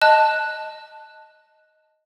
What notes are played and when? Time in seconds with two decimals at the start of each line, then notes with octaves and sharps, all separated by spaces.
0.01 D#5 A5 F#6